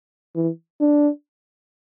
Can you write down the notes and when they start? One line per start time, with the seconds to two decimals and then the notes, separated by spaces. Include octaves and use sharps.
0.36 E3
0.81 D4